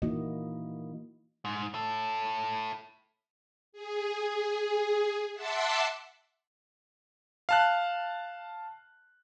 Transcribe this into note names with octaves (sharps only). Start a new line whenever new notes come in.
E3 A#3 D#4 E4 F#4 D#5
G#2
E4 A4
G#4
E5 F#5 A5 C6 D6 E6
F5 A5 F#6